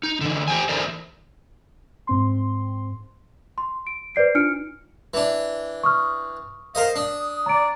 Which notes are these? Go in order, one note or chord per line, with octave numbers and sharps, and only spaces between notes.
D#4
D3 E3
G4 C5 G5 G#5
E3 A4 A#4 C5 D5
G#2 C4 C6
C6
D7
B4 C5 D5 C7 D7
D4 D#4 F4 F6 C#7 D7
E3 D4
C#6 D#6 F6
A#4 C5 D#5 F5
D4 D#6
D5 A#5 D7